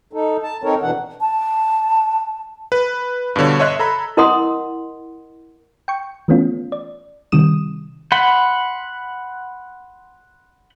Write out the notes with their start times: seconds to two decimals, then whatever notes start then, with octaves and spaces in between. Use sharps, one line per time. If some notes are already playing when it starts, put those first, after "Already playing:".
0.13 D#4 A4
0.43 A5
0.64 C4 D#4 A4 A#4 C#5
0.82 B2 E3 D4 F#5
1.21 A5
2.72 B4
3.36 G2 B2 D3 C#5
3.60 C#5 D#5 E5 C6 F#6 G#6
3.79 A4 A#5 B5
4.17 E4 A#4 D#5 F#5 C6 D#6
5.88 G5 C#6
6.28 E3 A3 B3 C#4 F4
6.72 D5
7.32 C3 D#3 G3 D#6 E7
8.12 F#5 B5 C6